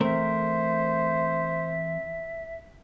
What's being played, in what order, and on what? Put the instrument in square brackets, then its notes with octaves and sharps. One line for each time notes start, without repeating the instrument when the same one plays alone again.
[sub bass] E3 [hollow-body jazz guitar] A3 C4 A#4 [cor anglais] C5 [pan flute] E5